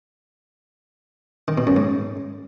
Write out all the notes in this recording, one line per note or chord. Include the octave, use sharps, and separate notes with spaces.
D#3
B2
F#2
G#2